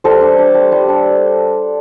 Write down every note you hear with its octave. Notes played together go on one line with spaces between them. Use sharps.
G3 A4 C5
D4
D4
G3
G3
D4